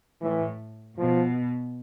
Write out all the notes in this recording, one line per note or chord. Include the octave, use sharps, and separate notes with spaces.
A2 E3
B2 F3